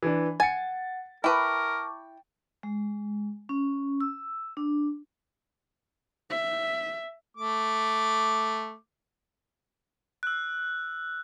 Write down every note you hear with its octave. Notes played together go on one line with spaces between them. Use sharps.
E3 D4
F#5 G#5 A6 C#7
E4 A#4 B4 G5 A5 C#6 D6
G#3
C#4
E6
D4
E5
A3 D6
E6 F#6